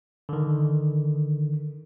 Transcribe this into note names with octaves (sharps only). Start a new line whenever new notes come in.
D3 D#3